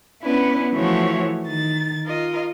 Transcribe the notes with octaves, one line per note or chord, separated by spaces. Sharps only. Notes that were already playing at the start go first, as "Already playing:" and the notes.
B3 C#4 D4 E4 B4
E3 F3 A3 F#4 C#5
D#3 A6
F4 A#4 D#5